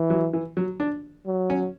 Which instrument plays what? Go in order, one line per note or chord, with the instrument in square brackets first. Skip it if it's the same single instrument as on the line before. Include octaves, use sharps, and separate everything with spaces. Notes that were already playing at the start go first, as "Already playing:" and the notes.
Already playing: [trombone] E3
[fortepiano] F#3
E3
F#3
D4
[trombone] F#3
[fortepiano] C#4